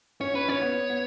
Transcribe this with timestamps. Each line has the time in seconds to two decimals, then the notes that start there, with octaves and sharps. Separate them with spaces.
0.20 C#4 C#5
0.34 C#4 B4
0.48 C#4 C#5
0.62 B3
0.90 B3